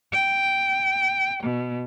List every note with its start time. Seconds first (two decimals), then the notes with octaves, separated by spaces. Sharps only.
0.12 G5
1.44 B2